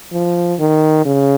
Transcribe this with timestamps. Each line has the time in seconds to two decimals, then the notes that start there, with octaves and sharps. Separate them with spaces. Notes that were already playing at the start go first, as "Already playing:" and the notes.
0.13 F3
0.59 D#3
1.05 C#3